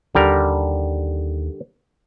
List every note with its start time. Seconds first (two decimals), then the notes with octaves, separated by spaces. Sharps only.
0.15 D#2 D3 D#3 G3 A#4